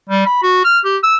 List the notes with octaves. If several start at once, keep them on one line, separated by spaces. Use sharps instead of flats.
G3
B5
F#4
F6
G4
E6